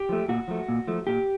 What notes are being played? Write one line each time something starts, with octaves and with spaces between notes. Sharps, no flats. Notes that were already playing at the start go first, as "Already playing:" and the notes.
Already playing: G4
F3 A3
A#2 F#4
F3 A3
A#2
F3 A3
A#2 G4